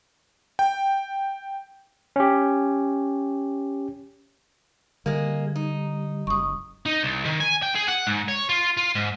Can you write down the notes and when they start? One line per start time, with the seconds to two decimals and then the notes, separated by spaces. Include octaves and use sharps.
0.59 G5
2.16 C#4 G4
5.06 D3 G3 G#3 A#3
5.56 D#4
6.27 F#1 C#6 D#6
6.86 D#4
7.03 C2
7.25 D#3
7.40 G#5
7.62 G5
7.75 G#4
7.88 F#5
8.07 G#2
8.28 C#5
8.49 F4
8.77 F4
8.95 G#2